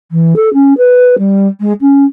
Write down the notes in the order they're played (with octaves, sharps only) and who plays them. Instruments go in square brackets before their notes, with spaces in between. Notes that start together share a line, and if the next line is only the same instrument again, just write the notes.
[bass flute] E3
A4
C#4
B4
G3
G#3
C#4